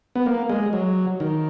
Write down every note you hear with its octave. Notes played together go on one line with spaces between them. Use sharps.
B3
A#3
G#3
F#3
D#3